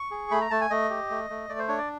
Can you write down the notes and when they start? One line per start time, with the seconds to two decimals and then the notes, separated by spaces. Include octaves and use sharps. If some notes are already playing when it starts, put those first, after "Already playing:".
Already playing: C#6
0.11 G#4
0.31 A3 B5
0.41 A#5
0.51 A3 A5
0.61 G#5
0.70 A3 D#5
0.90 G4
1.10 A3
1.30 A3
1.49 A3 D5
1.59 C5
1.68 D4 C#5
1.78 D5